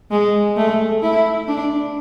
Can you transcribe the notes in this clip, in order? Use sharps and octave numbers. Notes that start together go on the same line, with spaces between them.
G#3
A3
E4
D4